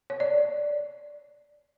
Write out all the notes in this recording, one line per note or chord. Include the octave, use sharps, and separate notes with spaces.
C#5
D5